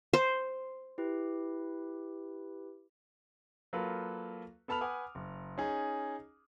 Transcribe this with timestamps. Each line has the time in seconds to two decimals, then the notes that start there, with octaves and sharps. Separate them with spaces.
0.13 C5
0.98 E4 G4 B4
3.73 F#3 A#3 F4 A4 B4
4.68 B3 A4 A5 B5 F6 F7
4.81 B4 F#5 G#5 D6 D#6
5.15 F#1
5.58 C#4 D#4 G#4